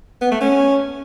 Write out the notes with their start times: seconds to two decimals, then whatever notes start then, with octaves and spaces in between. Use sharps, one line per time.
0.22 B3
0.31 A3
0.41 C#4